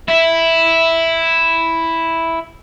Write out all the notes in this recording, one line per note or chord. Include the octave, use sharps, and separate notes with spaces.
E4 E5